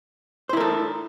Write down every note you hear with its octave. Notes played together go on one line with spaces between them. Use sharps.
E4 A4 A#4 C5